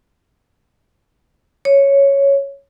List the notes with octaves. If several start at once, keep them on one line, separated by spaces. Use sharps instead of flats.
C#5